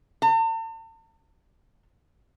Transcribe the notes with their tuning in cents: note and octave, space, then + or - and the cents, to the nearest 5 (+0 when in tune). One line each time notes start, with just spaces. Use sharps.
A5 +45